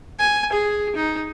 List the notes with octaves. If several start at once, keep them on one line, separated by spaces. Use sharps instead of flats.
G#5
G#4
D#4